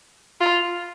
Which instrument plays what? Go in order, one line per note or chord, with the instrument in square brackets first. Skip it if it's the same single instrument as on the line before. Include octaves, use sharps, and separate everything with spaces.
[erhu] F4